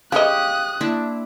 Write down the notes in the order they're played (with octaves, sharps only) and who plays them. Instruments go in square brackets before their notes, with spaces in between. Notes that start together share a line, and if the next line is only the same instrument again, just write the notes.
[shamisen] C#3 D#5 [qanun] G4 C#5 [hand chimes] F5 [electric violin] D#6 F#6
[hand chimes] A#3 [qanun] D4 E4